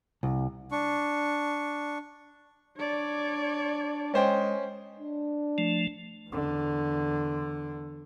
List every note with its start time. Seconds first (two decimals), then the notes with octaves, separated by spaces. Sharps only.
0.23 C2
0.72 D4 C#6
2.78 D4 C#5 D5
4.14 G#3 C#4 C5 G5
5.00 D4
5.58 F3 A3
6.30 E2 D3